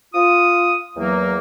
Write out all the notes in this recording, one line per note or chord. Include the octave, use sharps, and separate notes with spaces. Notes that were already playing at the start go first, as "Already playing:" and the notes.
F4 D#6
E2 F#3 A#3